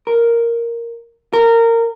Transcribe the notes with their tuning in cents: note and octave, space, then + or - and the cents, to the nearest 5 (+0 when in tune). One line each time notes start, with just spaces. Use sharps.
A#4 +0
A#4 -20